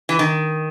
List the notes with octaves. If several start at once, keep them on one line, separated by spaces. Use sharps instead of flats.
E3
D#3